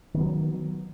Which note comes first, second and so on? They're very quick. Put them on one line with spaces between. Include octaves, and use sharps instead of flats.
D#3 B3 F#3